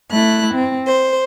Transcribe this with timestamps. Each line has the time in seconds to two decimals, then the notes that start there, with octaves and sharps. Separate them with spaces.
0.11 A3 E4 F#6
0.54 C4
0.88 C5